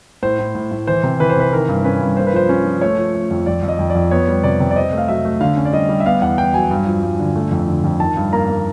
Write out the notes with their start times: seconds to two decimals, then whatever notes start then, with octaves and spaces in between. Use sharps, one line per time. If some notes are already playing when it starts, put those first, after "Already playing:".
0.23 A2 C5
0.39 A2
0.55 A2
0.72 A2
0.87 E3 C5
1.03 C3
1.20 E3 B4
1.30 C5
1.36 C3 B4
1.52 D#3 A#4
1.69 G2
1.84 C#4 B4
2.01 G2
2.17 A#3 C5
2.27 B4
2.33 F3 C5
2.49 C#4
2.65 F3
2.81 A3 C#5
2.98 F3
3.14 A3
3.31 F2
3.46 F2 D5
3.63 F2
3.68 D#5
3.79 F2
3.90 D5
3.95 F2
4.11 B3 C#5
4.28 G3
4.43 C3 D5
4.60 C3
4.71 D5
4.76 C4 D#5
4.93 A3
4.98 F5
5.08 F#3 E5
5.25 A3
5.41 D3 F5
5.57 C#4
5.65 D5
5.73 G3 D#5
5.89 G3
6.00 E5
6.06 B3 F5
6.22 E2 F#5
6.38 E2 G5
6.54 F#3 G#5
6.71 G2
6.87 F3
7.03 G2
7.19 D3
7.35 A3
7.51 F2
7.68 D3
7.84 F2
8.00 D#3 A5
8.17 G2
8.32 A#3 A#5
8.48 A#3